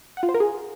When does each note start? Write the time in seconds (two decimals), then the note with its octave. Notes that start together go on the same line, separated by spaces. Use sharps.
0.17 F#5
0.23 F4
0.29 C5
0.34 A#4
0.40 G#4